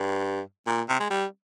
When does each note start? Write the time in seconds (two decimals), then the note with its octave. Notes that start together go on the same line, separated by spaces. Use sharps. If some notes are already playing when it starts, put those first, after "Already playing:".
Already playing: G2
0.67 A#2
0.89 C3
1.00 G#3
1.10 G3